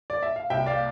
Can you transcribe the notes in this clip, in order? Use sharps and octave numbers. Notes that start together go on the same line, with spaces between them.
D5
E5
F5
C2 E5 G5
D5 F5